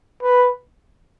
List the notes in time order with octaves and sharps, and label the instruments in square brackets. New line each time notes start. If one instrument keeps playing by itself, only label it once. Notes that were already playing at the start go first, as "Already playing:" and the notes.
[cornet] B4